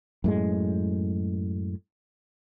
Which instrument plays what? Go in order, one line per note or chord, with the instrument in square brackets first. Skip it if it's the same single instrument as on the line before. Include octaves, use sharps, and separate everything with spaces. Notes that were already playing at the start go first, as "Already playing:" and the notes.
[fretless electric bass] F#2 A2 G#3